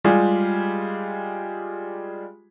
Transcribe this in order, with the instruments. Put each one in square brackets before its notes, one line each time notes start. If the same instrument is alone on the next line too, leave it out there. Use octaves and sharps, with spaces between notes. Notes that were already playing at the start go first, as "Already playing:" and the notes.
[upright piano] G3 G#3 F4 G4 G#4